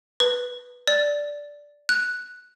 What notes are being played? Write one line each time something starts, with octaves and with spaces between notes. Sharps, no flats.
B4
D5
F#6